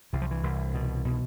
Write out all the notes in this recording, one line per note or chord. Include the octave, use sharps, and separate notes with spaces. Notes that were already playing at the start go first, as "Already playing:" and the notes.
C2 E3
F3
E3
C2
B2
B2